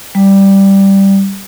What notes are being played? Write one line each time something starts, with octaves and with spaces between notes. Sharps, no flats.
G3